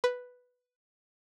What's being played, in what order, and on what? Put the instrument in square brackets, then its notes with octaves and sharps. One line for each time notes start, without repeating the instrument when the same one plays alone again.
[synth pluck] B4